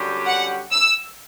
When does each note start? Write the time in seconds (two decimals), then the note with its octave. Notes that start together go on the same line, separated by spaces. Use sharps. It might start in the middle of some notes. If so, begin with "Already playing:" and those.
Already playing: F#2 D3 G3 C#4 G4
0.26 F#5
0.72 E6